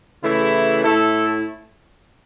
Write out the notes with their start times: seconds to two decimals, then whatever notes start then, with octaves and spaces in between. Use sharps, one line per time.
0.23 C#3 E3 A3 E4
0.84 A2 A3 E4 A4